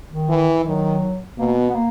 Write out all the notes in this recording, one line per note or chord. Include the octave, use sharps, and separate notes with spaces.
D#3
E3
D#3 F#3
B2 A#3
B3
B3
A#3